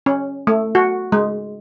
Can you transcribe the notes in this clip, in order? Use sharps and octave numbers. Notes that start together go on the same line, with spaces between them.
C#4
A3
F#4
G#3